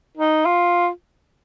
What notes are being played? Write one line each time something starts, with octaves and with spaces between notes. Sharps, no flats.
D#4
F4